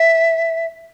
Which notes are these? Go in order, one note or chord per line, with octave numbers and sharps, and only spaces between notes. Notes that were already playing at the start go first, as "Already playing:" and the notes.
Already playing: E5